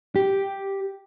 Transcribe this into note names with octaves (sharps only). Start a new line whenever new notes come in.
G4